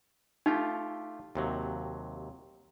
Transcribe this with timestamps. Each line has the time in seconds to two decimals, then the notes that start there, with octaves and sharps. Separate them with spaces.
0.46 A3 D#4 F4 G4
1.35 D#2 C3 F#3